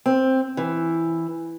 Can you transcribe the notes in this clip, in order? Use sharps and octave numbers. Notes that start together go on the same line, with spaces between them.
C4
E3